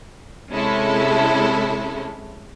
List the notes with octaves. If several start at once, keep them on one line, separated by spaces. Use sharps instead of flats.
C3 G#3 C#4 E4 A4